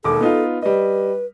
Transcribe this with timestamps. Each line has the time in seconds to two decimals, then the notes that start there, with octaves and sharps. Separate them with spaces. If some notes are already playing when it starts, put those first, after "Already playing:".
0.04 E1 D#2 A4 D6
0.21 B3 D#4 F4
0.62 G3 B4 D#5